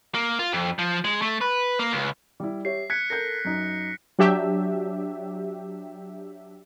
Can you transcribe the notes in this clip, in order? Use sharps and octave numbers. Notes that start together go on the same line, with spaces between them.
A#3
F4
F2
F3
G#3
A3
B4
A#3
C#2
G3 E4
G4 C#5 E5 C7
F#6 G#6 B6 C#7
A4 A#4 G6 A#6
F#2 D#4
F#3 D4 G4 E5